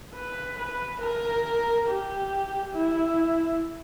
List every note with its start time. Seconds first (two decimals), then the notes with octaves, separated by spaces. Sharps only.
0.15 B4
0.58 B4
1.01 A#4
1.87 G4
2.74 E4